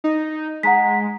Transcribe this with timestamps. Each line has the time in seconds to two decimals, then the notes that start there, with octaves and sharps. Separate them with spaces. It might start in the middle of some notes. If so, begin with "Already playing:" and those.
0.04 D#4
0.63 G#3 F#5 A#5 B6